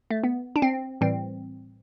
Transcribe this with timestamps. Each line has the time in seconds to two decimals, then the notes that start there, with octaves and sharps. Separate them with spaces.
0.11 A3
0.24 B3
0.56 D4
0.62 C4
1.01 A2 E3 G3 C4